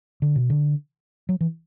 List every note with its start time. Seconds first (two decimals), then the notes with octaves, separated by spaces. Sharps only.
0.22 D3
0.36 B2
0.50 D3
1.29 F#3
1.41 E3